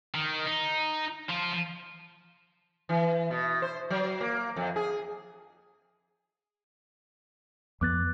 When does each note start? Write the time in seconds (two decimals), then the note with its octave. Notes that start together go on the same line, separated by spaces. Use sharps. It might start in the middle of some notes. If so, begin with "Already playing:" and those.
0.14 D#3
0.45 D#4
1.29 F3 F4
2.89 E3
3.30 B2
3.62 C5
3.90 F#3
4.21 A#3
4.56 F2
4.76 G#4
7.81 F2 B3 D6 F#6 A6